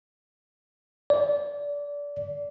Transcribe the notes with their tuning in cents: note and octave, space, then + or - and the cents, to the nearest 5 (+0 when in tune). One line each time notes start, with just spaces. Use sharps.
D5 -25